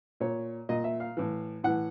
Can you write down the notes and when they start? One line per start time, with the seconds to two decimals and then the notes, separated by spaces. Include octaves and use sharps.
0.20 A#2 C#5
0.69 A#2 D#5
0.84 E5
1.00 F5
1.17 A2 E3
1.64 A2 E3 F#5